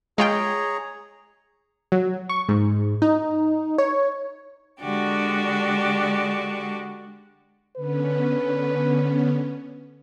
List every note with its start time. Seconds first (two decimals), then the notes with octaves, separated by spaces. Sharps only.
0.18 G#3 F4 G#4 C#5 G5 A#5
1.92 F#3
2.29 C#6
2.49 G#2
3.02 D#4
3.78 C#5
4.80 D3 G#3 D4 F#4 G4
7.76 D3 B3 C#4 B4